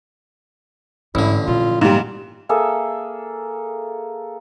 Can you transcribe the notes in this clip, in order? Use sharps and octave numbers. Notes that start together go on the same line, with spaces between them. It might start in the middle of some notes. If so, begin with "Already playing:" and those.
A1 G#2 D3 E4
A#2 F3 F4
G#2 G3 A#3
A#3 G#4 A4 E5